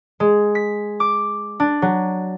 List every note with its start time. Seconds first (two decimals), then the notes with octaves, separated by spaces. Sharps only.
0.20 G#3
0.55 B6
1.00 D6
1.60 D4
1.82 F#3